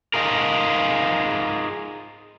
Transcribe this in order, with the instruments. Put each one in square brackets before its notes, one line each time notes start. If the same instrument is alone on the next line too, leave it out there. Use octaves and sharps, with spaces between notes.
[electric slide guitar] D#4 F4 G#4 A#4